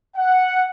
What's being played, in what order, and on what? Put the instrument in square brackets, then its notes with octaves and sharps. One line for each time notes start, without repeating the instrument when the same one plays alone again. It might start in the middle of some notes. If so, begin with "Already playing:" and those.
[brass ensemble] F#5